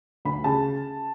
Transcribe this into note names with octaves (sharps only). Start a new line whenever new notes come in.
D2 B5
C#3 A5